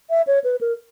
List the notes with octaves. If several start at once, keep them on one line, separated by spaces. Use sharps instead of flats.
E5
C#5
B4
A#4